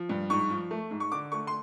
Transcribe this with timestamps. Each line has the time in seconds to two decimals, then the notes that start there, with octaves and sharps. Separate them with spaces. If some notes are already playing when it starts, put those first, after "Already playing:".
Already playing: F3
0.09 G2
0.30 G#2 C#6
0.50 F3
0.71 A3
0.91 G#2
1.00 C#6
1.12 D3 D6
1.32 A3 C#6
1.47 C6